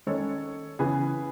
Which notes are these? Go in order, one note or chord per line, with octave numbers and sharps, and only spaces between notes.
D#3 G#3 C#4 A4 C#5
C#3 E3 B3 G#4 B4